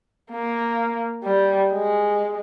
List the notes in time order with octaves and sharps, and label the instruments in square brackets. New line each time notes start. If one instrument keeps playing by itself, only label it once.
[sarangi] A#3
G3
G#3